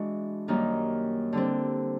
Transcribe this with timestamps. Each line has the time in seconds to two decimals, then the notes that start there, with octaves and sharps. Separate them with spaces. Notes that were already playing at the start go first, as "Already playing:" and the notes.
Already playing: E3 G#3 D4 F#4
0.48 F#2 D#3 G3 A#3 D#4
1.33 D3 G3 C4